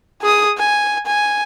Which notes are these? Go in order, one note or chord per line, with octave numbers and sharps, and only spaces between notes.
G#4 D#6
G#5
G#5